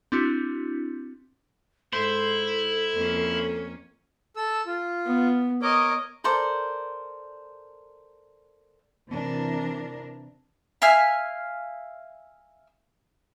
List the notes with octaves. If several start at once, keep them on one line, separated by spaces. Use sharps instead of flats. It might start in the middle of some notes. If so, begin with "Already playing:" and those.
C4 D4 E4 F#4
G#2 E4 A4 C5
F2 A#3 C#4
A4 E6
F4
B3
A#4 C#5 D#5 D6
A4 A#4 C5 D5
C3 E3 D4 A#4
E5 F5 G#5 F6